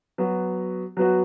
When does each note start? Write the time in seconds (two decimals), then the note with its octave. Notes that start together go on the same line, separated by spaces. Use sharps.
0.18 F#3 B3 F#4
0.97 F#3 B3 F#4